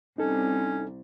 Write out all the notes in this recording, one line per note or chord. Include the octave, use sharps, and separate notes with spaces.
C2 C#4 D#4 A4